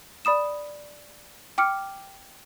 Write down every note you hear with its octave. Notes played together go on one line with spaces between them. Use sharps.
D5 B5 D#6 E7
G5 D6 F6 C#7